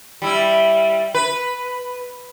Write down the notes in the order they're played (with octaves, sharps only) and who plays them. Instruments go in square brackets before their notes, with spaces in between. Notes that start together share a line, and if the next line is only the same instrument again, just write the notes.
[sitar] G3 E4
B4